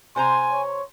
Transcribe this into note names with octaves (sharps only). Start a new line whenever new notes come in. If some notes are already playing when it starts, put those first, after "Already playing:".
C3 C5 G#5 A#5 C6
C#5